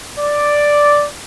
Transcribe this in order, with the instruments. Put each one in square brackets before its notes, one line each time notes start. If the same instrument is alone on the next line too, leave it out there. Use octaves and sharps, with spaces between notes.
[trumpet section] D5